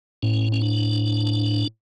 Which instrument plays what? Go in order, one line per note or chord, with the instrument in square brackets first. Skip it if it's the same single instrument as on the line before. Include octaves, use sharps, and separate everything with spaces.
[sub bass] A2 [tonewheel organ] C#4
[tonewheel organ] C#4
D4